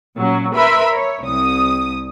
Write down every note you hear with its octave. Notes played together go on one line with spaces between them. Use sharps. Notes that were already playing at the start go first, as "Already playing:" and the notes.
A#2 F#3 C#4
A#4 B4 E5 B5 C6
C#5
C2 D#6